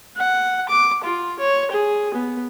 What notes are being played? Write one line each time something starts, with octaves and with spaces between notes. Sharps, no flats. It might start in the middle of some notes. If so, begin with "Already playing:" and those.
F#5
D6
F4
C#5
G#4
B3